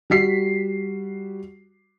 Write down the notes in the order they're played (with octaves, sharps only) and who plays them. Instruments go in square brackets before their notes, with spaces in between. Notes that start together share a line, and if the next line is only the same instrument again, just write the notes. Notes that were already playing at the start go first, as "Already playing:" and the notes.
[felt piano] G3 F#4 B6 C7